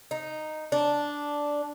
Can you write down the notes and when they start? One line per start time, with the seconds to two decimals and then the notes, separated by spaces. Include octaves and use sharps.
0.11 D#4
0.72 D4